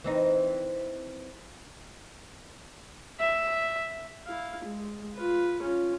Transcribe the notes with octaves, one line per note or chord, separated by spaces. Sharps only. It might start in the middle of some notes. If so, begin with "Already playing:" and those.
E3 C4 D#4
E5
E4 F5
G#3
F4 B4
C#4 F4